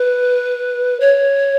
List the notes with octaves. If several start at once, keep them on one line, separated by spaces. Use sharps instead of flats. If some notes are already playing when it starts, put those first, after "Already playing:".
Already playing: B4
C#5